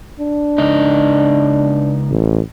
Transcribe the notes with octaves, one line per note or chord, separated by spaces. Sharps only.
D4
C#2 D#4
A1